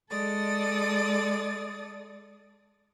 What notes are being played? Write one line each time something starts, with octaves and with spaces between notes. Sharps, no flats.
G#3 A4 D5 D#6 A6